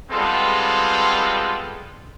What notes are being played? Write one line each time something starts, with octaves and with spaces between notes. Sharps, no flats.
G3 G#3 B3 C4 F4 A4